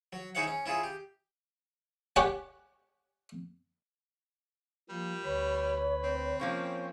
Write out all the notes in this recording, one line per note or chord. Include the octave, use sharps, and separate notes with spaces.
F#3
D#4 E4 G#4 C#5 F5 F#5
C#4
C#4 E4 F4 G#4
G4
G4 C#5 F#5 G#5
F3 G3 A#3
D2 B4 C#5 B5
C4
F3 A#3 C#4 C#5 G5